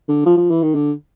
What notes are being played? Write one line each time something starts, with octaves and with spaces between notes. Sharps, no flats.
D3
F3
F3
E3
D#3
D3